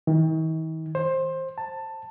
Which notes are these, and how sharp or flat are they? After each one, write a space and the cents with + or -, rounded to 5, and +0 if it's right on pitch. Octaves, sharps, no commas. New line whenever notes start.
D#3 +45
C5 +20
A5 +15